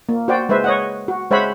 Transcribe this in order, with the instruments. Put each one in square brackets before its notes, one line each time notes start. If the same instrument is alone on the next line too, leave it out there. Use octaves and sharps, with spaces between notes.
[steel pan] A#3
F#4 C5 D5 G5
G#3 B4 C5 E5
C#5 D#5 F#5
F#4
G#3 C5 C#5 E5 F#5 B5